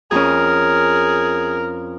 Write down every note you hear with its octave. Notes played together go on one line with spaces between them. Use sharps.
F2 C#4 G#4 A#4